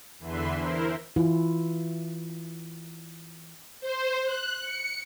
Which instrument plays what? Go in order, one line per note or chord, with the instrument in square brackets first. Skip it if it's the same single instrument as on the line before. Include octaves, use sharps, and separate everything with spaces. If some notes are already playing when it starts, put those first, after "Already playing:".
[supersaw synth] E2 D3 E3 B4 E5 C6
E4 A#4 C5
[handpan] E3 E4 F4
[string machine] C5
F#6
C#7